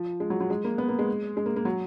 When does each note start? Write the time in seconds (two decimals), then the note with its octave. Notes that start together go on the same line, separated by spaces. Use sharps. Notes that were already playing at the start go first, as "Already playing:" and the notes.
Already playing: F3
0.20 G#3
0.30 F#3
0.40 F#3
0.50 G#3
0.65 A#3
0.78 B3
0.88 A#3
0.99 G#3
1.37 G#3
1.46 A#3
1.56 A#3
1.65 F#3